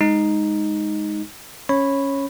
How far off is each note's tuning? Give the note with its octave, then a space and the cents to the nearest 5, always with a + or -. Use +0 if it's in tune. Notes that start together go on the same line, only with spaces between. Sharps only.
G#3 +0 D#4 +0
C#4 +0 C#5 -15 B5 +0